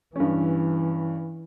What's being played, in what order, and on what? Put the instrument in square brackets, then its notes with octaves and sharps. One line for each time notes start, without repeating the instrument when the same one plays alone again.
[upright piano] G2 C#4 [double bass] E3